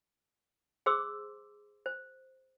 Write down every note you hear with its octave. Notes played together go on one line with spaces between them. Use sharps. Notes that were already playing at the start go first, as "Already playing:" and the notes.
G#4 C5 C6 D6 E6
C5